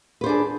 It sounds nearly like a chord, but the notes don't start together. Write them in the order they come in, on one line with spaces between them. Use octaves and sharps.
B4 C5 D4 G#4